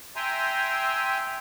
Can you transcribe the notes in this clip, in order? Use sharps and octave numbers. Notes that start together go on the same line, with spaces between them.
E5 G5 G#5 A#5 C6